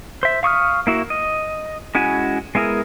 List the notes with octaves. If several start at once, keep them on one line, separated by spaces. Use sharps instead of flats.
C5 E5
F5 C#6 D#6 F6
A#3 E4 F#4
D#5
G#3 C#4 E4 F#4 G#5
G#3 B3 E4 G#4 A#4